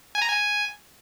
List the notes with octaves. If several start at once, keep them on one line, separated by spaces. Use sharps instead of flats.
G#5
A#5
G#5